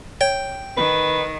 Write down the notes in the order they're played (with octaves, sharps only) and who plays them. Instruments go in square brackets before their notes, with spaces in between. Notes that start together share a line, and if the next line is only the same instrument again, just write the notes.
[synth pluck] C#5 [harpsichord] G5
[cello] D#3 [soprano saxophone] B4